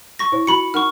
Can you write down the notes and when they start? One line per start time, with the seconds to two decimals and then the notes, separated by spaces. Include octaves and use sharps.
0.19 C#6 A#6
0.32 E4 C5 C#5
0.47 F4 F#4 B5 C#6 C#7
0.74 D#4 A#4 F#5 C#6 F6